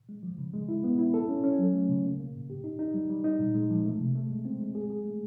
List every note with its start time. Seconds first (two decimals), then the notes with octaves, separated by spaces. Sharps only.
0.09 G#3
0.23 F3
0.38 C#3
0.53 G#3
0.69 E4
0.84 B3
0.99 E4
1.14 A4
1.29 C#4
1.44 C#4
1.59 F#3
1.74 A3
1.89 C#3
2.05 A#3
2.20 A#3
2.34 A2
2.50 G4
2.64 D#4
2.79 D#4
2.94 G3
3.10 G3
3.24 D#4
3.39 A#2
3.55 G#3
3.70 F3
3.85 A3
4.00 C3
4.15 A3
4.30 G#3
4.45 C4
4.61 G#3
4.75 G#4
4.90 G#4
5.05 A3